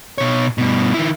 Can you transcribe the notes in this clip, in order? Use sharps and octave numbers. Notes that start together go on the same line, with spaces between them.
B2 C#5
G2 B2
D#3 E4